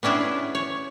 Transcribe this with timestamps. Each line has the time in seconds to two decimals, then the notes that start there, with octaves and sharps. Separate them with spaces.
0.03 B3 C#4 D4 E4 G#4
0.55 C#5